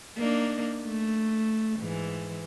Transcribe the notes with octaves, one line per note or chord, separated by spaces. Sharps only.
A#3 D4 D#4
A3
G#2 E3